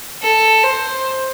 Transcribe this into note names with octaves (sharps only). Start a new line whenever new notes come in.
A4
C5